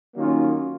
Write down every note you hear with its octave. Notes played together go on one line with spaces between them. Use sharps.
D#3 F#3 A#3 C#4 F4